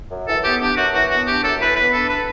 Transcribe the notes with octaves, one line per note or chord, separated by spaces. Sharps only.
F#2
E3 A4
B3 G4
D4 G4
F#2 F#4
E3 F#4
B3 F#4
D4 G4
F#2 A4
E3 B4
B3 B4
D4 A4
B4